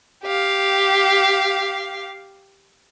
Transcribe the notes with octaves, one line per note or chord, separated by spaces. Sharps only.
G4 F5